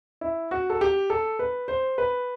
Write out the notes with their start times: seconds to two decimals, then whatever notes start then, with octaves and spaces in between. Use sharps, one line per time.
0.21 E4
0.51 F#4
0.70 A4
0.81 G4
1.10 A4
1.39 B4
1.68 C5
1.98 B4